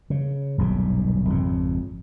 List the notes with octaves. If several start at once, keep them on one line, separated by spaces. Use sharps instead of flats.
C#3
D#1 B1 G2 D#3
G#1 F2 C#3